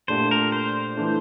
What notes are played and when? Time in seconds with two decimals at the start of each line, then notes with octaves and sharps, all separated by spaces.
0.08 A#2 A3 D4 G4 C5
0.31 A#4
0.52 C5
0.97 E3 A3 D4